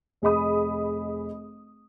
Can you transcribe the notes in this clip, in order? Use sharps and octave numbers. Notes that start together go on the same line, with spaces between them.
F1 G#4 D#5 B5 D#6